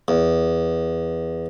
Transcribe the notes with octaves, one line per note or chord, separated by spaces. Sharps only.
E2